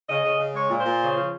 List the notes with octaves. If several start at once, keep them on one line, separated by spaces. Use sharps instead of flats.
C#3 D#5
C#3
C#3
G#3 C#5
A#2
C5
A#2
C#3
F3